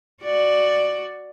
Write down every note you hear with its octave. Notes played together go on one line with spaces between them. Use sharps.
F#4 D5